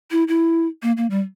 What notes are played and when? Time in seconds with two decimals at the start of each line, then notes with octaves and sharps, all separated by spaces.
0.11 E4
0.28 E4
0.83 A#3
0.97 A#3
1.10 G3